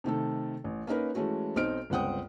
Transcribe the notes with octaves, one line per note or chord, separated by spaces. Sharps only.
C3 D#3 A3 A4
A1
A#3 C#4 D#4 A#4 B4
E3 G#3 A3 C#4 F#4
B1 C4 D#4 D#5 F6 D7
G1 C#2 C4 F#5 G5 D#6